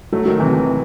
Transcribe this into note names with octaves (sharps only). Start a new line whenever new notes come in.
F#3 A3
D#3 F#3
C3 E3
C3 E3